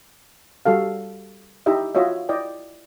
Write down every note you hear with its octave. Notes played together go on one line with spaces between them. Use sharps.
G3 F#4 A4 F5
D#4 E4 G4 D#5 E5
F4 F#4 C#5 D#5 E5
E4 D5 D#5 G5